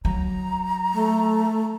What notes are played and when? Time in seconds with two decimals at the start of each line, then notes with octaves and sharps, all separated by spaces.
0.05 F#3 A#5
0.93 A3